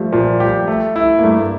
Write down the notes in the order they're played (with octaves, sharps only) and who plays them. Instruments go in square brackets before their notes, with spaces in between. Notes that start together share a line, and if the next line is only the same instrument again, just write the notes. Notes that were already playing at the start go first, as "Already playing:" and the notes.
Already playing: [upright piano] F3 G3 A3
[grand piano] A#2 [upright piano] F3
[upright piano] G3 [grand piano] G4
[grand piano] A3
E4
[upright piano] A#3
[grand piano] G2 [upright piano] A3